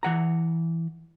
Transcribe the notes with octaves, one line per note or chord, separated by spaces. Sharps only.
E3 F#5 A#5